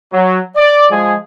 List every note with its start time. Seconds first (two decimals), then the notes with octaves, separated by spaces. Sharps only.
0.12 F#3
0.56 D5
0.90 F3 G#3 G#4